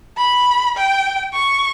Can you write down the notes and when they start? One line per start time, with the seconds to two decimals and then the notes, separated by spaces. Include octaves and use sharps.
0.17 B5
0.77 G5
1.34 C#6